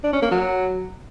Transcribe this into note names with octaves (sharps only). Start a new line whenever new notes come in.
D4
C#4
A#3
F#3